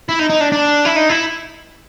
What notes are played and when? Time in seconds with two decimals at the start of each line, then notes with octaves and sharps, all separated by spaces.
0.09 E4
0.19 D#4
0.30 D#4
0.41 D4
0.52 D4
0.85 E4
0.96 D#4
1.09 E4